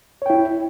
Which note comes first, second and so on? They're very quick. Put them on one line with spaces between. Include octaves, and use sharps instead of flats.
C#5 G5 E4